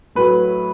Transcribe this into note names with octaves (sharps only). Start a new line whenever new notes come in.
A2 F#3 A3 B4